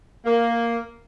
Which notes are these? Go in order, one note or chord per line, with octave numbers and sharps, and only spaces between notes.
A#3